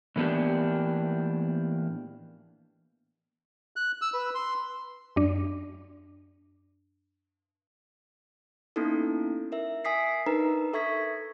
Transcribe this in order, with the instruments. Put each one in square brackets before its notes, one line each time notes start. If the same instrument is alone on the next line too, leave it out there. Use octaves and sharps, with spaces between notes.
[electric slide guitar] A2 E3 A#3 B3 D4 G4
[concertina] F#6
E6
B4
C6
[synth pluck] F#2 D4
[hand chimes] A#3 B3 C#4 D#4 E4 A4
A#4 E5
E5 G#5 D#6 B6 C7
D4 D#4 A#4 B4 A#5
A4 E5 C#6 G#6 B6